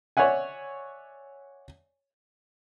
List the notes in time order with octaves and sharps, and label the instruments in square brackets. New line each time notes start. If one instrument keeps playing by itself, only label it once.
[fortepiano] C#5 D5 E5 F#5 G#5